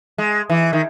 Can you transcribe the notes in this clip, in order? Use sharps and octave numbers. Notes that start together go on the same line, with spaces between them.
G#3
E3
D#3